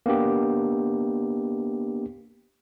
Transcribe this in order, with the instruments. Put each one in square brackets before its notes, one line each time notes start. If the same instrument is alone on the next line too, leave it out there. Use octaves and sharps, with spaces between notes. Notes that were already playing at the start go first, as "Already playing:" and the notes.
[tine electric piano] A#3 B3 D4 G4